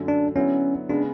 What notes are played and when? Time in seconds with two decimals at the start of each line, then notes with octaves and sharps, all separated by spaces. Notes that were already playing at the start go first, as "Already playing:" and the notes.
Already playing: F#2 D3 A3
0.08 D4
0.36 D3 F#3 B3 C#4 E4
0.89 C#3 G#3 B3 D4